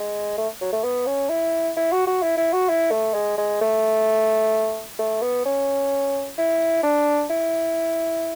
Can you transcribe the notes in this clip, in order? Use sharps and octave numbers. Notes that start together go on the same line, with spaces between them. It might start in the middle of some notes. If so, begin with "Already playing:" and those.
Already playing: G#3
A3
F#3
A3
B3
C#4
E4
E4
F#4
F#4
E4
E4
F#4
E4
A3
G#3
G#3
A3
A3
B3
C#4
E4
D4
E4